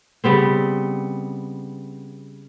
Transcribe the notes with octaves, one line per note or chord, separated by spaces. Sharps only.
C#3 G3 B3 C4